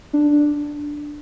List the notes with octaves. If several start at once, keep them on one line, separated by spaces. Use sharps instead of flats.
D4